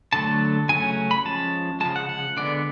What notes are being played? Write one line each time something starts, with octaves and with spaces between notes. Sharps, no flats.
D3 F#3 A3 A5
C#3 F#3 A3 C#4 G#5
B5
F3 G#3 C#4 A5
C#3 F3 G#3 A5
F#5
F#5
D3 G#3 B3 D5